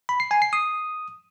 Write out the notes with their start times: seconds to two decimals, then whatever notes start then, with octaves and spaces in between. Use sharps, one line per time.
0.09 B5
0.20 C7
0.31 G#5
0.42 C7
0.53 D#6